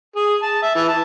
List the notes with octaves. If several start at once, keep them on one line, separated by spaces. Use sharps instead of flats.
G#4
A5
E5
E3
A5